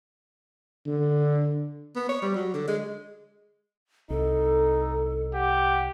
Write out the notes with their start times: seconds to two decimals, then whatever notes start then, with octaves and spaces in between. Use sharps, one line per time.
0.87 D3
1.96 B3
2.09 C#5
2.22 G3
2.35 F#3
2.54 D3
2.68 G#3
4.10 C2 D#4 A4
5.34 G4 F#5